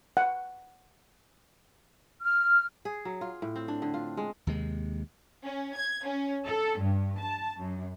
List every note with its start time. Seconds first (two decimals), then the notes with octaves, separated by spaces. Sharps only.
0.17 F#5
2.22 F6
2.85 G#4
3.05 F#3
3.21 F4
3.42 A2
3.56 C4
3.68 D4
3.82 D3
3.94 F4
4.17 G#3
4.47 D#2 C3 G#3
5.45 C#4
5.75 G#6
6.05 C#4
6.45 A4
6.78 G2
7.19 A5
7.59 F#2